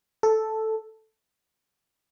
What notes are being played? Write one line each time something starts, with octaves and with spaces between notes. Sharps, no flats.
A4